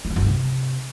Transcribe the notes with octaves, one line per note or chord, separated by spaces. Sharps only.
G3
E3
F#2
G2
C3